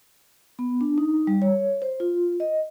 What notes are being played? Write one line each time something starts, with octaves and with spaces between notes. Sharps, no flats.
B3
D4
D#4
G3
C#5
C5
F4
D#5